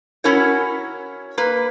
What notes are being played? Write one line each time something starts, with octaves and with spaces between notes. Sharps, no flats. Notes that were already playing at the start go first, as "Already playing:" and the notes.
C#4 E4 F#4 A#4 C#5
A#3 B4